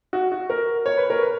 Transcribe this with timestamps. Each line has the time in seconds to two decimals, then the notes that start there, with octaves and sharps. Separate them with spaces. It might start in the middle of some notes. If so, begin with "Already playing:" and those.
0.13 F#4
0.32 F#4
0.50 A#4
0.86 C#5
0.98 B4
1.10 A#4
1.22 B4